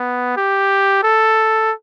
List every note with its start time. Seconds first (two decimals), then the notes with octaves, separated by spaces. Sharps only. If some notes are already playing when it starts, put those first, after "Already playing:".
Already playing: B3
0.37 G4
1.03 A4